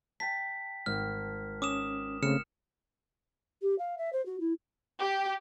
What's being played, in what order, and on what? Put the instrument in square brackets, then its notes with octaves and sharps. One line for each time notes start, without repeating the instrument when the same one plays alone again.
[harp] G5 A5 [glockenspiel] B6
[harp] G#1 [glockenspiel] F6
[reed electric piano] C#4 [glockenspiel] D6 D#6 E7
[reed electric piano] C#3 A3 C4 [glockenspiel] F6 C#7 E7
[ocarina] G4
F5
E5
C5
F#4
E4
[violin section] G4